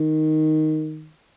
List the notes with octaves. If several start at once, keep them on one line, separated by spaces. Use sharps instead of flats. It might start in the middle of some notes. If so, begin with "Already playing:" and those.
Already playing: D#3